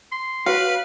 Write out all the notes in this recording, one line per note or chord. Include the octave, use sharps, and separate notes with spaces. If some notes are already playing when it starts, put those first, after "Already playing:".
C6
F#4 B4 C#5 F5